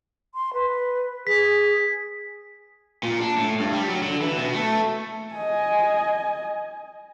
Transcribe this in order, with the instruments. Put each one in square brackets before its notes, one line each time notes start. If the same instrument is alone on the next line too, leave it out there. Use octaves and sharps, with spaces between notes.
[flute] C6
B4
[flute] G#4 [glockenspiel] B6
[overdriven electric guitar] A#2
D4
A2
G2
G3
F#3
D3
E3
B2
A3
[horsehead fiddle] D#5 G#5